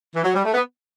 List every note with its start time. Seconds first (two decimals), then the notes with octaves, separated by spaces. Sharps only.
0.15 E3
0.24 F#3
0.34 G3
0.45 A3
0.54 B3